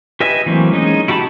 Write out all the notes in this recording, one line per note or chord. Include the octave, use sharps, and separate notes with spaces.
G4 B4 D#5 E5 G#5
E3 F#3 A3 A#3 C4
G#3 C#4 D#4 D#5
E4 F#4 G4 A5 B5